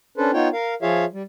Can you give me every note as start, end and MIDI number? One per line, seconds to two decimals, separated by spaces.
0.18 0.31 61
0.18 0.31 62
0.18 0.31 69
0.18 0.31 71
0.18 0.31 72
0.33 0.48 59
0.33 0.48 63
0.33 0.48 65
0.33 0.48 73
0.33 0.48 79
0.53 0.74 70
0.53 0.74 77
0.82 1.05 53
0.82 1.05 65
0.82 1.05 68
0.82 1.05 73
0.82 1.05 76
0.82 1.05 77
1.13 1.23 55